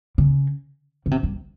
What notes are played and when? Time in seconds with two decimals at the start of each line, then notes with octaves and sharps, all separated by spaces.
0.18 C#3
1.06 C#3
1.11 C3
1.23 G2